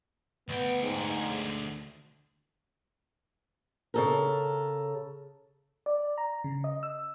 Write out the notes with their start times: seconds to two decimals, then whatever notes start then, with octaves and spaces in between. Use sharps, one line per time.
0.49 D2 B3 G5
0.82 G#2
3.94 C#3 A4 A#4
5.86 D5
6.18 A#5
6.44 C#3
6.64 D#5
6.83 E6